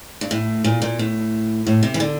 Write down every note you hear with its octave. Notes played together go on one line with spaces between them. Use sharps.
G2
A2
A#2
A#2
A2
A2
C3
E3
D3